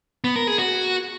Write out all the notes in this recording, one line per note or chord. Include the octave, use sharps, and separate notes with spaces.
B3
A#4
G#4
F#4